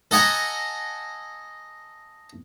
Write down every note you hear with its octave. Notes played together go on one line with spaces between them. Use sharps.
A4 D#5 F#5 G#5 A#5